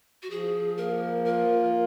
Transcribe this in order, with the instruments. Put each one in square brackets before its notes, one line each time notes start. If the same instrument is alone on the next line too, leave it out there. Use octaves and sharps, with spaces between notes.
[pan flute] F#4
[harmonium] F3 [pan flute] G#4
[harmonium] A#3 [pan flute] A#4
[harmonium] F4 [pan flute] A#4